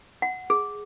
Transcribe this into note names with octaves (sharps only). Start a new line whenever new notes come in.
F#5
G#4